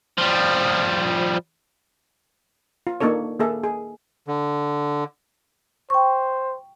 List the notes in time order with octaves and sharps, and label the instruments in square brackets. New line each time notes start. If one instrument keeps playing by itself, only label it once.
[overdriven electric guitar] F3 G3
[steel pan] F4
A#3 D4 D#4 A4 C#5
A#3 G#4 A4 E5
G#4
[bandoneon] D3
[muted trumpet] C5 [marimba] G5 C#6